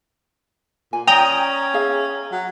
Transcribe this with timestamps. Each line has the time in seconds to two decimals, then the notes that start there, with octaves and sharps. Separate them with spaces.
0.93 A#2 G#5
1.08 C#4 D5 G5 A#5 D#6 F7
1.74 G#4 E5 F5
2.32 F#3